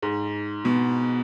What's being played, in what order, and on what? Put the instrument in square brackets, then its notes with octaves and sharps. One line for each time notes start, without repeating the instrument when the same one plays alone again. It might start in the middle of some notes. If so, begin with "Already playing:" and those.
[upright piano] G#2
B2